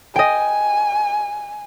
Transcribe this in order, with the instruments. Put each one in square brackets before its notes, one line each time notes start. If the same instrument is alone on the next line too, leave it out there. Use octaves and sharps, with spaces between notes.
[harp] D#5 G5 [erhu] G#5